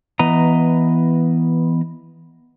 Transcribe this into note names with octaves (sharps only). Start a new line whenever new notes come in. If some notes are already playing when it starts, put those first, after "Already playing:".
E3 B3 D#5 A#5